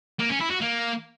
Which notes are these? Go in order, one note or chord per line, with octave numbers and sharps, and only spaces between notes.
A#3
C#4
E4
F#4
A#3